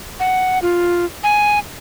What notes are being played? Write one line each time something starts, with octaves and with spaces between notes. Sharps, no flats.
F#5
F4
G#5